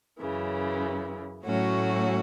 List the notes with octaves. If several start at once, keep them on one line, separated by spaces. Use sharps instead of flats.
F#2 C#3 E3
A2 F#3 A3 C#4 F#4